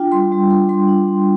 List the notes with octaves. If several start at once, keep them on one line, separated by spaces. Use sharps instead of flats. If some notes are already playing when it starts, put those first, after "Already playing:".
Already playing: D4 F4 G5
G3 C6
G3
D4 C6
G3 C6
D4
D4